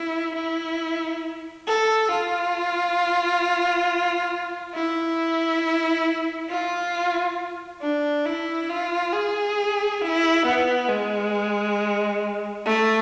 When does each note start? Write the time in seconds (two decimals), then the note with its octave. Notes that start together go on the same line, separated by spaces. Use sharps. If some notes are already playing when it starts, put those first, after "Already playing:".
Already playing: E4
0.35 E4
1.67 A4
2.11 F4
4.75 E4
6.50 F4
7.82 D4
8.26 E4
8.70 F4
9.14 G#4
10.01 E4
10.46 B3
10.89 G#3
12.66 A3